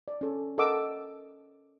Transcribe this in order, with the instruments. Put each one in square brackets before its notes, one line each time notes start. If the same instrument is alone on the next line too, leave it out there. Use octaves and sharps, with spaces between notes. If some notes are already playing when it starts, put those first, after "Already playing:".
[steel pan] D5
C#4 A4
A4 A#4 D#5 F#5 D6 E6